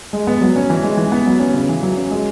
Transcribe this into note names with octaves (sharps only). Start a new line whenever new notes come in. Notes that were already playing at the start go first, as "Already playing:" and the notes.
G#3
B3
F#3
C#4
E3
G#3
E3
B3
F#3
C#4
C#3
E3
F#3
C#4
G#3